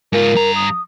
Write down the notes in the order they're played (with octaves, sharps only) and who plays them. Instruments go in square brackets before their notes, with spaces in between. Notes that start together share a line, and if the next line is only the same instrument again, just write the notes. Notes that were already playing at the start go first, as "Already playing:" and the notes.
[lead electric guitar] G#2 F4 [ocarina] A#4
[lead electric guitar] G2 A#5
[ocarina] D#6